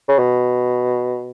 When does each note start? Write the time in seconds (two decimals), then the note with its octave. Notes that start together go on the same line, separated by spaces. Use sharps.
0.08 C#3
0.18 B2